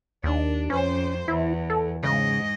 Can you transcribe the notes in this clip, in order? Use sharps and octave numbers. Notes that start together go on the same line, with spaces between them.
D#2 D4
F2 C#4 C5
E2 E4
A4
G#2 C#3 D#5